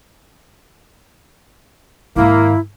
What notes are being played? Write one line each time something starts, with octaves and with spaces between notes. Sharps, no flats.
G#2 D#3 A#3 E4